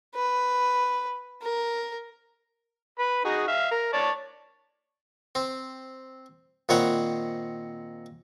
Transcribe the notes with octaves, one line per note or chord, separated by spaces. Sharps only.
B4
A#4
B4 B5
D#4 F#4 G#4
E5 F5
A#4
C#5 D5 A5
C4
A#2 D#3 C4 C#5 F#5 B5